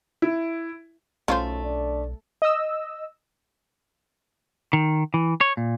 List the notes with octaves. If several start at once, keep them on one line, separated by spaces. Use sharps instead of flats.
E4
B1 F#2 A3 C#4 D#4 F4 C5
D4 D5
D#5 E6
D#3
E3
C#5
A#2